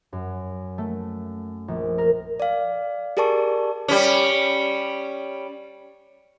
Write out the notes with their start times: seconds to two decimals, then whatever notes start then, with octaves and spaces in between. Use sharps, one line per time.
0.13 F#2
0.78 A3
1.68 A#1
1.98 A#4
2.40 D5 F5
3.17 G4 G#4 A#4 D5 A5 C#6
3.88 G3 C#4